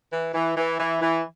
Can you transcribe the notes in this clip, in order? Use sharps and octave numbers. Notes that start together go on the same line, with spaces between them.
E3
E3
E3
E3
E3